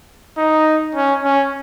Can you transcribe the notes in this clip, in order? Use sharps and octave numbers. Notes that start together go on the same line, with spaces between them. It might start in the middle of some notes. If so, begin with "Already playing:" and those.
D#4
C#4
C#4